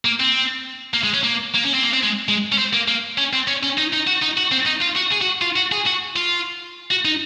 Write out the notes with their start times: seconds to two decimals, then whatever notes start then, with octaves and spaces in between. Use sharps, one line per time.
0.05 A#3
0.20 C4
0.94 A#3
1.04 G#3
1.14 C#4
1.24 A#3
1.54 A#3
1.64 C#4
1.74 C4
1.83 A#3
1.94 C4
2.03 G#3
2.29 G#3
2.52 C#4
2.58 C4
2.73 A#3
2.88 A#3
3.18 C#4
3.33 C4
3.47 C#4
3.63 C#4
3.77 D#4
3.93 D#4
4.07 F#4
4.22 D#4
4.37 F#4
4.52 C4
4.66 D#4
4.82 F4
4.96 F#4
5.12 G#4
5.22 F#4
5.41 F4
5.56 F#4
5.72 G#4
5.86 F#4
6.16 F4
6.91 F#4
7.05 D#4